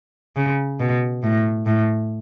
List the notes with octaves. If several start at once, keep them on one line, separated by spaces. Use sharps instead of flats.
C#3
B2
A2
A2